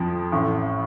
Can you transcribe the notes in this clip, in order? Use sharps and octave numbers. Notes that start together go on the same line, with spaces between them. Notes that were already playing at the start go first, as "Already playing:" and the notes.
Already playing: F2 F3
A1 A2